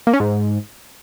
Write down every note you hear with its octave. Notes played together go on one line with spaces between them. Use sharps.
A#3
C#4
G#2